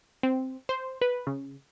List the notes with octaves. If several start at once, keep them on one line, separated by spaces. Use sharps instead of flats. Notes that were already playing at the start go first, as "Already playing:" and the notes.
C4
C5
B4
C#3